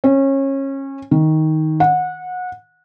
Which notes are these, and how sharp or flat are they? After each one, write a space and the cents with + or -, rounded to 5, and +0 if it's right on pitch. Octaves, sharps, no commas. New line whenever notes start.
C#4 -25
D#3 +10
F#5 -25